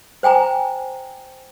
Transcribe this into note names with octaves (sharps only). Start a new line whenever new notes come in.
C5 G5 G#5 A#5